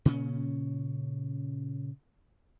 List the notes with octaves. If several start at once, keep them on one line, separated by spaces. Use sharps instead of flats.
A#2 C#3 C#4